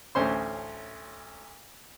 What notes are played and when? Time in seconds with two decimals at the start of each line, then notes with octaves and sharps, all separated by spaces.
0.15 A1 D2 C#4 C5 C6